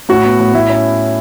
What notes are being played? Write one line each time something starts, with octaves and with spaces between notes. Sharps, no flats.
A2 F#4
B3
A2
A2 E4
C#4